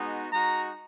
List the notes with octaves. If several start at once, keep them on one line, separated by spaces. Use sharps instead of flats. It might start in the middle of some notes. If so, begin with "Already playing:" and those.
Already playing: G#3 B3 D#4 F#4
G#3 D#4 F#4 A#5